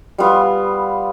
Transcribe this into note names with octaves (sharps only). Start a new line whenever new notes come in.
G3 B3 F4